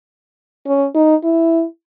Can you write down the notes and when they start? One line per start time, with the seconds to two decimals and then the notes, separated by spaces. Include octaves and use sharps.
0.67 C#4
0.95 D#4
1.24 E4